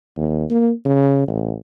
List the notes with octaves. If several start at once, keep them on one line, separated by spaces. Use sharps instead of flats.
D#2
A#3
C#3
A1